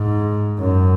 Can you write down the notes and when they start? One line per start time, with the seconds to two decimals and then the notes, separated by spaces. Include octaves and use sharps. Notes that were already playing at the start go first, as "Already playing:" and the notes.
Already playing: G#2
0.59 F#2